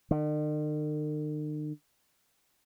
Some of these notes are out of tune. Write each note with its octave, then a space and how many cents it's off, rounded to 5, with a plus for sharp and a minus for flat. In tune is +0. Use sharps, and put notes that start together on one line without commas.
D#3 -45